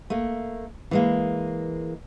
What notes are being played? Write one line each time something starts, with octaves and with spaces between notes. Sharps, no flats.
A3 A#3
E3 G#3 A#3